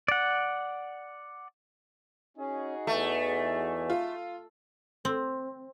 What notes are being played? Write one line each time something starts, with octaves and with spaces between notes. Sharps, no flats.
D5 F#5
C#4 D#4 F#4 G#4
E2 E3 A3
F4
C4